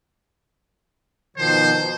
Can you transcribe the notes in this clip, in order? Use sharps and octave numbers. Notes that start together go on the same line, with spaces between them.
B2 D#3 F3 C5